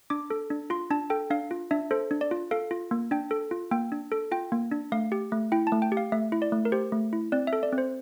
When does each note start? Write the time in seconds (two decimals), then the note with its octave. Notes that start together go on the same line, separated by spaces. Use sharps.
0.10 D4 D6
0.30 A4
0.50 D4
0.70 F4 C6
0.91 D4 A5
1.10 A4 G5
1.31 D4 F5
1.51 F4
1.71 D4 E5
1.91 A4 C5
2.11 D4
2.21 D5
2.31 F4
2.51 A4 F5
2.71 F4
2.91 A#3
3.11 D4 G5
3.31 A4
3.51 F4
3.71 A#3 G5
3.92 D4
4.12 A4
4.32 F4 G5
4.52 A#3
4.71 D4
4.92 A3 F5
5.12 G4
5.32 A3
5.52 E4 G5
5.67 A5
5.72 A3
5.82 G5
5.92 G4
5.97 F5
6.12 A3 E5
6.32 E4
6.42 D5
6.52 A3
6.65 A#4
6.72 G4 C5
6.92 A3
7.13 E4
7.32 C4 D5
7.47 E5
7.53 A4
7.63 D5
7.72 C4
7.78 C5